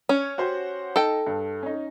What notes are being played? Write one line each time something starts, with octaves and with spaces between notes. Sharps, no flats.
C#4 C#5
F#4 G4 C5
D#4 A4 G5
G2
C#4 D#4